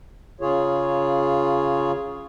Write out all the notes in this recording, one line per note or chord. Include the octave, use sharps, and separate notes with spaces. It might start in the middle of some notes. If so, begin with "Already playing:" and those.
C#3 F4 G#4 C#5